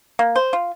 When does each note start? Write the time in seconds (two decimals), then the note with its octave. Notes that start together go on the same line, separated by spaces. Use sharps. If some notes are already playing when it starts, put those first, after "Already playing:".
0.19 A#3
0.36 C5
0.53 F4